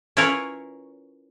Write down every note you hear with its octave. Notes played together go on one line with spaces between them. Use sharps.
C#4 E4 F4 A#4 B4 C#5